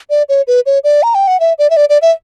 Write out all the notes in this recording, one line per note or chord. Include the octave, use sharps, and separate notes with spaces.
D5
C#5
B4
C#5
D5
A#5
G5
F#5
E5
D5
E5
D5
D5
E5